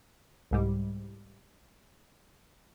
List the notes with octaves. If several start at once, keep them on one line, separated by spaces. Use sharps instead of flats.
C2 G#2 G3